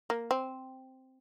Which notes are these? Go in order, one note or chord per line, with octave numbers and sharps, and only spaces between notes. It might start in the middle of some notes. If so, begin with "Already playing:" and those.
A#3
C4